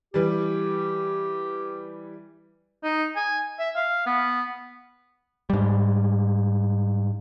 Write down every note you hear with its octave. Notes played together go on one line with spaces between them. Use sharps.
E3 G3 G4
D#4
G#5
E5
F5
B3
G#2 G3